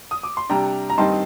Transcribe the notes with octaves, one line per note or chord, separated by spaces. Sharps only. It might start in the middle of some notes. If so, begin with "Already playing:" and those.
D#6
D6
C6
C3 G3 D4 G5 A#5
A#5
G2 D#3 G3 C4 D#4 A5 C6